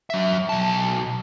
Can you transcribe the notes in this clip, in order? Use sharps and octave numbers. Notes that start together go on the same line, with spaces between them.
F#3 E5
B1 A5